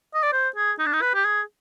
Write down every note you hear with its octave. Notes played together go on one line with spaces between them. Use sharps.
D#5
D5
C5
G#4
D#4
D4
D#4
B4
G4
G#4